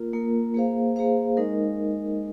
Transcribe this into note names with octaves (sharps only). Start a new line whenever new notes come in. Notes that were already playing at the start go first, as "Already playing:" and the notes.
Already playing: A#3 F4 A#4
A#3 F4 A#4
A#3 G#4 C5 F5
A#3 G#4 C5 F5
G#3 D#4 A#4 D#5